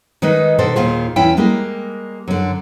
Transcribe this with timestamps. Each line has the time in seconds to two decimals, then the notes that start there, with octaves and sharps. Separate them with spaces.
0.22 D#3 G#3 D#4 B4 D#5
0.58 B2 D3 D#3 A4 C5
0.76 D#2 A#2 D#3 F4 G#4
1.16 E2 C#4 E4 G5
1.37 G3 G#3 A#3
2.28 F#2 D3